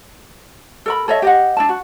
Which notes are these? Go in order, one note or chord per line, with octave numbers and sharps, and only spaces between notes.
A4 A#4 B5
A4 C#5 D#5 E5
G4 D#5 F#5
D4 E4 A5
F#4